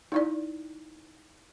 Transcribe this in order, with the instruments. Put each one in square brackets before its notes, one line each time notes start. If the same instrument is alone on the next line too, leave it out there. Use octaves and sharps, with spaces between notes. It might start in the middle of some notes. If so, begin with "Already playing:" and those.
[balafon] D#4 E4 D5